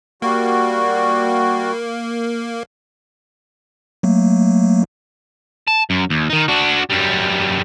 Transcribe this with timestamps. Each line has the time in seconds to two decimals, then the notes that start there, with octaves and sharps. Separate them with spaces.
0.22 G3 A#3 F#4
4.03 F#3 A3 A#3
5.68 A5
5.90 F#2
6.10 D#2
6.30 D#3 D#4
6.48 D4 F#4
6.90 F#2 G3